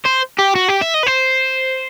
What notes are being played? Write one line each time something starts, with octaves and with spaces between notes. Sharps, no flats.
C5
G4
F#4
G4
E5
D#5
B4
C5